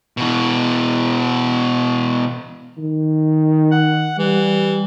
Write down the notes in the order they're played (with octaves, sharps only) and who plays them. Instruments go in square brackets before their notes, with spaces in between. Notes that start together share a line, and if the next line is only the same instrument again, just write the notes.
[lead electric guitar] B2 E3
[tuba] D#3
[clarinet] F#5
[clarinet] E3 [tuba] G3